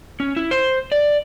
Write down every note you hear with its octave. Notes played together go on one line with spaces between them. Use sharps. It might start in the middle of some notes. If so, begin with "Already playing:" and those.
C#4
E4
C5
D5